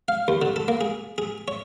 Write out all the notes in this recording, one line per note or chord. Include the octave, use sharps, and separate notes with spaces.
F5
D#2
D3
A4
A#3
G#4
G#4
C#5